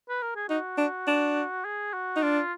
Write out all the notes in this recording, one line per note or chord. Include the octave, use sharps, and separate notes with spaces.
B4
A#4
G#4
D#4 F#4
D4
D4
G#4
F#4
D#4
D4 F4